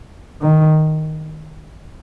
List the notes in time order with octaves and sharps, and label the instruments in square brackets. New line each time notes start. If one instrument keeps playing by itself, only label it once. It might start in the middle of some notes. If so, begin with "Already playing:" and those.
[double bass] D#3